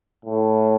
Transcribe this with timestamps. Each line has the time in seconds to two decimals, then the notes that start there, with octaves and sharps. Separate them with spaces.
0.25 A2